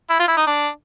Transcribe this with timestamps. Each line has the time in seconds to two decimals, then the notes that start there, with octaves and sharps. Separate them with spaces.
0.10 E4
0.20 F4
0.28 E4
0.37 D#4
0.47 D4